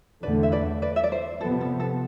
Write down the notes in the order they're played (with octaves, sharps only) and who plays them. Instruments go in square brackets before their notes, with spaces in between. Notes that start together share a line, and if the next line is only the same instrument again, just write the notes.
[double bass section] E2 D3 A3 [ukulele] B4 D5
[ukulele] E5
B4 D5
B4 D5
E5
D5
C5
[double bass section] C3 F3 B3 [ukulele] A4
[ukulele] A4
A4